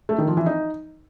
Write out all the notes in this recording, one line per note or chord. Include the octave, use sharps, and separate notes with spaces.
A3
D#3
F3
E3
D#4